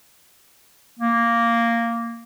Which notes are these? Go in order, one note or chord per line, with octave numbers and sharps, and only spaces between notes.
A#3